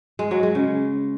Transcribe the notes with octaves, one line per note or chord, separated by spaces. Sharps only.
G#3
F#3
G#3
C#3